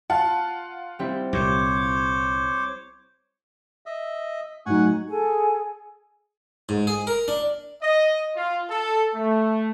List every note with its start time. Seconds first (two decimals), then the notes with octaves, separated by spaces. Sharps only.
0.10 F4 F#5 A5
0.99 G3 C4 E4
1.33 C2 A#2 C5 C#5 D6
3.86 D#5 E5
4.66 A2 F#3 D#4 F#5 G#5 C#6
5.08 G#4 A4 G#5
6.69 G#2
6.87 G#4
7.07 A#4
7.28 D4
7.81 D#5
8.36 F4
8.70 A4
9.14 A3